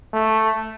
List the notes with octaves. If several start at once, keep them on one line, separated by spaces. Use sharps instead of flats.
A3